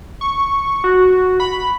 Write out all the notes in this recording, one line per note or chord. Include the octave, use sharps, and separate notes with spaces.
C#6
F#4
B5